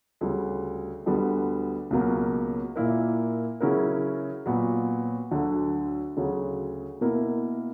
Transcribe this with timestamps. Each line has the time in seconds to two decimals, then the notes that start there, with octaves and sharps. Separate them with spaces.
0.21 D2 C#3 G3
1.06 D2 D3 G3 B3
1.90 C#2 B2 F#3 A#3
2.76 A#2 A#3 E4 A#4
3.60 C#3 F#3 C#4 E4 A#4
4.46 A#2 F#3 B3
5.31 D2 D3 F#3
6.16 D2 C#3 F#3
7.01 B2 A#3 E4 A#4